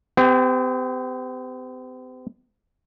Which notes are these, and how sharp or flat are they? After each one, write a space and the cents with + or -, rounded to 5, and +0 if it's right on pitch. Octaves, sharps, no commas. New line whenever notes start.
C4 -45 G4 +20